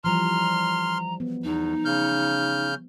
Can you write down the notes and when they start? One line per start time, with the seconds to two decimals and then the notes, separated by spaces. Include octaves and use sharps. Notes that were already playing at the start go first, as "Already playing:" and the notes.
0.04 E3 F3 G3 A#5 C6 F6
1.20 B3
1.44 E2 D#4
1.85 C#3 F6 G6